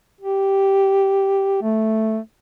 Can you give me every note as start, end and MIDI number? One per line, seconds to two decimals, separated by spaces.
0.21 1.60 67
1.62 2.19 57